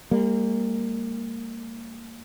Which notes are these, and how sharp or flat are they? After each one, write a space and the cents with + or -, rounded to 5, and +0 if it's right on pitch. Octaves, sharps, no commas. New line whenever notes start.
G3 +40 A#3 -20